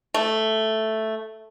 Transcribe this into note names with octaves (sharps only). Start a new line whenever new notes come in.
A3